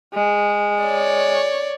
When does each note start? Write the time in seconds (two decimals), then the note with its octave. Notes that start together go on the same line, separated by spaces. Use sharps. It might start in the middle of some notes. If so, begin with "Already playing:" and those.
0.14 G#3
0.84 C#5 D5